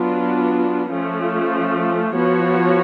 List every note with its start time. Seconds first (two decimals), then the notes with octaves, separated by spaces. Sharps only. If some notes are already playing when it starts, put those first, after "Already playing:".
Already playing: F#3 B3 D4 F4
0.91 F3 A3 C#4 F4
2.14 F3 B3 F#4 C#5